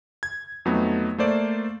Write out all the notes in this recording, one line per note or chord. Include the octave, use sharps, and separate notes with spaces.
G#6
F2 F#3 A3 B3 D#4
A3 A#3 C5 D5